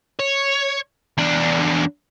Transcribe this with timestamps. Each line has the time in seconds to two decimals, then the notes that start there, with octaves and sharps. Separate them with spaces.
0.19 C#5
1.18 E2 D4